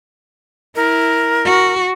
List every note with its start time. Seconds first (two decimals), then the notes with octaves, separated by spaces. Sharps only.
0.76 E4 A#4
1.45 F#4